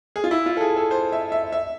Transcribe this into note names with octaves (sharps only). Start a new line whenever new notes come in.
G#4
F4
E4
F4
A4
G#4
A4
C5
E5
E5
E5